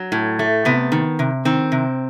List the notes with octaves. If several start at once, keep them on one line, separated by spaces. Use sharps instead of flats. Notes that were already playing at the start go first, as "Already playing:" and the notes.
Already playing: F#3
A2
A3
C3 B3
D#3
C3
D#3 C4
C3